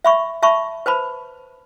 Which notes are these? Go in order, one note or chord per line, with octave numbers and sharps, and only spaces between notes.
E5 B5 C#6
E5 A5 B5 C#6
B4 C5 A5 B5